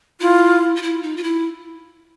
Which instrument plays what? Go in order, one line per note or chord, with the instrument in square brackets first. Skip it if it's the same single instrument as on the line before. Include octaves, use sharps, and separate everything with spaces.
[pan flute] E4 [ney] F4
[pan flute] F4
E4
D#4
F4
E4